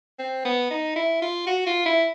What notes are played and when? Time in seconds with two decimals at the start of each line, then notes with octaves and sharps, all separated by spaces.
0.19 C4
0.45 B3
0.70 D#4
0.96 E4
1.22 F4
1.47 F#4
1.66 F4
1.86 E4